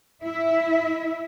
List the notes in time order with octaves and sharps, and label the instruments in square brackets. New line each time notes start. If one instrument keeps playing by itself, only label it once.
[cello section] E4 E5